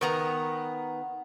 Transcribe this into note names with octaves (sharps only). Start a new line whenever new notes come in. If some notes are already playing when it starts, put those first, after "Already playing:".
D#3 B3 A#5